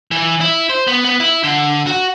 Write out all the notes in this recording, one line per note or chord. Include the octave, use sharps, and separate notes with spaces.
E3
E4
C5
B3
B3
E4
D3
F#4